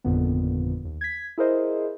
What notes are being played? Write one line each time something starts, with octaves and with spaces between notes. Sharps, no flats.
G#1 F2 A#2 D3 B3
D#2
G#6 B6
E4 G#4 A#4 C5 D#5